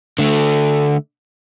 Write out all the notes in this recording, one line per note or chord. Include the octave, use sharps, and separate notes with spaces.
D3 A3